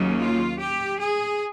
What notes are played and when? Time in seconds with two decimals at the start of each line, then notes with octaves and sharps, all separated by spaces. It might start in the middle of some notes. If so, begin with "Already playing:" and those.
Already playing: D#2 C#3 F#3 A#3
0.19 F4
0.59 G4
1.00 G#4